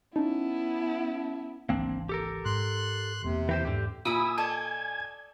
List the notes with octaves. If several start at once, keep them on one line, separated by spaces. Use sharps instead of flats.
B3 C#4 D#4 E4 A5
G#1 C#2 E3 A#3 C4 D4
G4 A4 A#4
G#2 C6 F#6
E1 E2 C3 A#3
E3 G4 C5
E2 G#2 D3 G4
A#2 E4 G#5 B5 D#6 E6
A4 D5 D#5 G#5 G#6